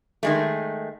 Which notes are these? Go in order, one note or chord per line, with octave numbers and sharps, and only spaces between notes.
D#3 G#3 A3